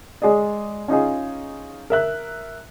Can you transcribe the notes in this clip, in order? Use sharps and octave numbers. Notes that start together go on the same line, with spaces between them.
G#3 G#4 D5 D#5
C#4 D#4 F4 G#4
A#4 E5 F#6